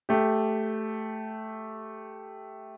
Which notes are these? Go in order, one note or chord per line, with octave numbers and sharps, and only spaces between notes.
A3 G4